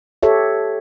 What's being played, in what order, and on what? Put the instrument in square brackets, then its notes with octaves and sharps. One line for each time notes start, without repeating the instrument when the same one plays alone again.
[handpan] G4 A4 C#5 E5